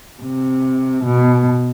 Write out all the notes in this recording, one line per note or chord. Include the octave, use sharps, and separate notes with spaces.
C3
B2